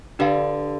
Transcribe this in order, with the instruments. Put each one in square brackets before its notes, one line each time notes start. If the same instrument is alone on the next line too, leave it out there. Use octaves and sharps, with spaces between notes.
[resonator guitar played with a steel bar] D3 [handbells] D4 G4 B4 F5